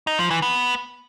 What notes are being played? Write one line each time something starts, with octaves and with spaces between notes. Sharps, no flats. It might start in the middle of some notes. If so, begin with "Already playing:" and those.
D#4
F3
E3
B3